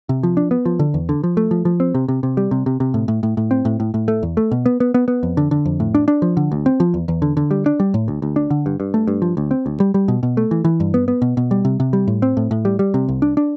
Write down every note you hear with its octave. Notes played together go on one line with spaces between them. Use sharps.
C3
F3
D4
B3
F3
D3
E2
D3
F3
A3
F3
F3
C4
C3
C3
C3
G3
C3
C3
C3
A2
A2
A2
A2
C4
A2
A2
A2
A3
E2
A3
B2
B3
B3
B3
B3
F2
D3
D3
F2
A2
D4
D4
F3
D3
D2
C4
F3
E2
E2
D3
D3
G3
D4
G3
A2
D2
D2
D4
D3
G2
G2
A3
G2
F3
D2
C4
D2
G3
G3
B2
B2
A3
E3
E3
G2
B3
B3
B2
B2
G3
C3
C3
G3
A2
C4
A2
A2
G3
G3
C3
C2
D4
D4